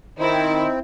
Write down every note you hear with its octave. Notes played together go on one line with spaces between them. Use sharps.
D#3 C4 D#4 E4